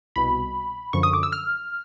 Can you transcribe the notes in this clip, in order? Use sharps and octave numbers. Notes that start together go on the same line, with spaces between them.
C2 B2 B5
F#2 D3 F3 C#6
D#6
D6
E6
F6